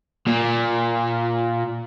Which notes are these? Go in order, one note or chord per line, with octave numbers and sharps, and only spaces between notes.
A#2